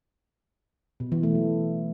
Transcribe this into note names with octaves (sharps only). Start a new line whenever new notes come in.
B2
E3
A3
F#3